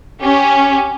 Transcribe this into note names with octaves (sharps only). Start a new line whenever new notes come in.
C#4 G4